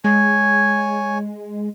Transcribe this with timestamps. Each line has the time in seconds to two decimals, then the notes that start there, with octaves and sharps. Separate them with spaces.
0.04 G#3 C#5 G#5